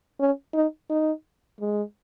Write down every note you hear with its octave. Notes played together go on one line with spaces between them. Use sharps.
C#4
D#4
D#4
G#3